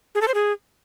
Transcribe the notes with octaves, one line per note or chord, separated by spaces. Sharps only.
G#4
A4
C5
G#4